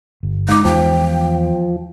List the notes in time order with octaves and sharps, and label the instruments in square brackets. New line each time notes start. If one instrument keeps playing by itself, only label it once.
[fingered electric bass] G1
[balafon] G#3 D6 [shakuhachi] D#4
[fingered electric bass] E2 [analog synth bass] F3 [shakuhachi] G5